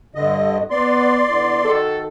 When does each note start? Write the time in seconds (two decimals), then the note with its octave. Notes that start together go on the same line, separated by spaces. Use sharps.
0.15 G2 D3 D#5
0.70 B3 D5 C6
1.30 D3 B3 E4
1.64 D#3 F#4 A4